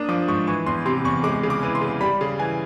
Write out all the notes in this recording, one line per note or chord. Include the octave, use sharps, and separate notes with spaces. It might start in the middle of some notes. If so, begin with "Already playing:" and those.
Already playing: A#3 D4 D#6
F3 D6
G#2 C#6
E3 C#6
E2 C6
C3 C6
E2 C#6
G#3 D6
C#3
D6
E3
C6
C#3
G3 B5
C#3
E3 G#5